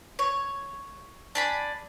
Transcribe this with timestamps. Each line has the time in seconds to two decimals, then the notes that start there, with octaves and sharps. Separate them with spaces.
0.19 C#5
1.35 D4 G#5 B5